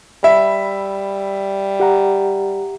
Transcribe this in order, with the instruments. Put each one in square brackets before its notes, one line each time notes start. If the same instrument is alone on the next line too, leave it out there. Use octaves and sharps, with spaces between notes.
[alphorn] G3 [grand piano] E5 [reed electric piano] B5
[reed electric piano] G4 F#5 A#5